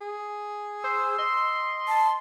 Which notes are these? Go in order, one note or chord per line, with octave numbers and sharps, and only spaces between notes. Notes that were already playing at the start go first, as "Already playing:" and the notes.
G#4
C5 E6
D#5 C6
A5